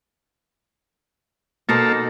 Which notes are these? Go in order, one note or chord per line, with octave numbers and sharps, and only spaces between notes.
B2 A#3 D#4 A4 C5